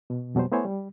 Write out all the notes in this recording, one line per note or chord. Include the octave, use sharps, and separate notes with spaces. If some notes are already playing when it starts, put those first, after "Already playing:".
B2
F2 B2 F#3 G3 C5
A3 B3 E4 C5 C#5 G#5
G3